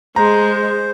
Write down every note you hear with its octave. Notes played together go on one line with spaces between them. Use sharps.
G#3 C5 A#5